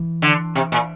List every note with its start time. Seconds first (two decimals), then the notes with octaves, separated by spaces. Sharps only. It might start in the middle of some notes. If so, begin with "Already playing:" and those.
Already playing: E3
0.22 D3
0.55 C3
0.72 A#2